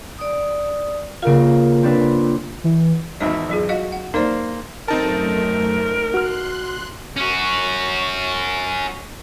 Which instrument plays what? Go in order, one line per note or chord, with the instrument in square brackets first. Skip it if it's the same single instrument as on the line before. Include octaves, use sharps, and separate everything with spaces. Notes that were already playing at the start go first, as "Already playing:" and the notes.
[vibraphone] D5 D#6
[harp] C#3 A#4 F5 [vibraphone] A#3 F4
[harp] C4 D4 B4
[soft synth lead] E3
[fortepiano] G#1 E2 E5 [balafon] G#3 D#4 D#5
[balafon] F#3 F4 G#4
[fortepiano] F#4 [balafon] D#5 F5
[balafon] F#5
[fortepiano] A#3 C5 [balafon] D#4 D5
[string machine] F#2 A3 [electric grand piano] C4 D#4 A5 [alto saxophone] A#4
[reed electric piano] F#4 F6 [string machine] C6 F#6
[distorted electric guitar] C#4 F#4